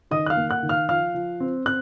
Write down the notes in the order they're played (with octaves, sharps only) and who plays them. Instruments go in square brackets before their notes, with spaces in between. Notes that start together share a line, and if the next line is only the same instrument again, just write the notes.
[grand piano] D#3 D#5 D#6
F#6
F5 F6
A#3
F#5 F#6
D#3
F5 F6
F3 F5 F6
F3
C4
C4 F#6